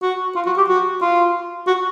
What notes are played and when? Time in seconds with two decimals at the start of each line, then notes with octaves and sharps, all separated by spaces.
0.02 F#4
0.36 F4
0.46 F#4
0.57 G4
0.69 F#4
1.02 F4
1.67 F#4